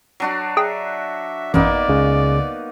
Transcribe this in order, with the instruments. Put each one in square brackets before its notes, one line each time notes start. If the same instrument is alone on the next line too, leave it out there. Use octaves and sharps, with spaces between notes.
[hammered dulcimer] F#3 D4 F#4
[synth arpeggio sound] G#4 G5 [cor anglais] E5
[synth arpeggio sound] A1 F#2 [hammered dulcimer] A#3 B3 D#4 [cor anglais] D5
[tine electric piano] C#2 C#3